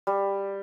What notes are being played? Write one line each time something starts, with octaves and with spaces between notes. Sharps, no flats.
G3